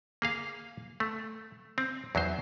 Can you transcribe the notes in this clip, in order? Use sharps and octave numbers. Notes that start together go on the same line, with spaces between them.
A#3 G#4 F5
A3
C4
E2 F#3 D#4 C5